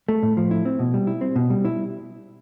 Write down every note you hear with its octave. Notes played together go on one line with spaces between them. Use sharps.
A3
A2
F3
E4
C4
B2
G3
E4
C4
B2
G3
E4